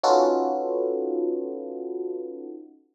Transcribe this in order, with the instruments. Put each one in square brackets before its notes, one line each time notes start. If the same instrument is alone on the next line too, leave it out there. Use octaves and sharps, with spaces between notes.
[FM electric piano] C#4 D#4 F4 F#4 A4 B4